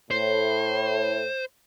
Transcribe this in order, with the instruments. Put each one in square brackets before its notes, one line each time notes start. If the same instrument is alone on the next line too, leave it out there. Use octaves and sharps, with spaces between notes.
[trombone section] A2 [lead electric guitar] C5